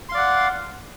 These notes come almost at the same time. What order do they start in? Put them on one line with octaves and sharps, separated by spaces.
C6 F5 D5 F#5